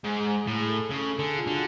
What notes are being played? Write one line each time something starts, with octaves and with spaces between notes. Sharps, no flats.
G#2 G#4
G#4
A2 G#4
A4
C#3 A4
A4
D3 G#4
F4
D3 F#4